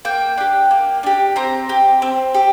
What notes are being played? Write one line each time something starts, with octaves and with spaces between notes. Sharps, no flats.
A#3 G5
D4 G4
A#3
D4 G4
C4 A#5
G4
C4
G4